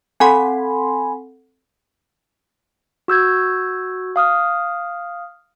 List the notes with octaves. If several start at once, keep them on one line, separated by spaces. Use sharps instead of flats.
C4 A4 F#5 G#5 B5 C6
F#4 E6 G6 G#6
F5 D#6 F6